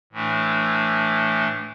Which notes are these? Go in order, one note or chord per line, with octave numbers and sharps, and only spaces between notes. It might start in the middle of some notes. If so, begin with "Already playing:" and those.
A2 E3 A3 D4